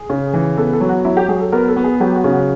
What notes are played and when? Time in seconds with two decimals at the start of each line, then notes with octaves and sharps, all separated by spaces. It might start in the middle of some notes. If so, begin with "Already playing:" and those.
Already playing: G#4
0.10 C#3
0.33 E3
0.57 B3 A4
0.73 A4
0.81 F#3
0.89 F#4
1.05 F#3 E4
1.17 G4
1.28 F#3 G#4
1.40 A4
1.52 B3 A#4
1.68 A4
1.77 B3
1.84 G#4
2.00 F#3 G4
2.16 F#4
2.24 C#3
2.32 F#4